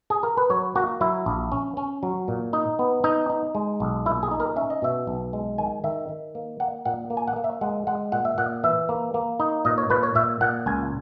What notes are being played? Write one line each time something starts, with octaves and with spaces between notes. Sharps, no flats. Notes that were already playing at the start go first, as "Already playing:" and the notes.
G#4
A#4
B4
F#3 C#5
A#3 F#4
F#3 E4
A#1
C#4
C#4
F#3
A#2
D#4
B3
D#4
D#4
G#3
B1
A#2 E4
G#4
D#4
A#4
C#4 E5
D#5
B2 E5
B1
G#3
D#3 G#5
D#3 E5
D#3
A#3
A#3 F#5
A#2 F#5
A#3
G#5
F#5
A#3
E5
G#3 F#5
G#3 F#5
A#2 F#5
E5
A#2 F#5
E3 E5
A#3
A#3
D#4
A#2 D#5
C#5
A#2 B4
C#5
A#2 E5
A#2 F#5
C#2 G#5